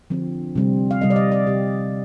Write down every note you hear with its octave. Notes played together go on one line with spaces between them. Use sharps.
D3 F3 C4
C3 G3 C4
F5
C3 G3 C4 D#5
D5
D#5
D5
C3 G3 C4 G4